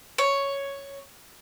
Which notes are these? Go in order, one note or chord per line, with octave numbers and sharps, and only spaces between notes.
C#5